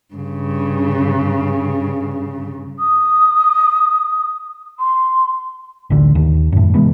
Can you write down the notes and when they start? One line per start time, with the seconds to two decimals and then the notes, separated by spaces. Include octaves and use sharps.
0.14 G2 C#3
2.79 D#6
4.79 C6
5.90 A1 D2 D3
6.15 D#2
6.52 F#2 A2
6.75 C3 E3 G#3 B3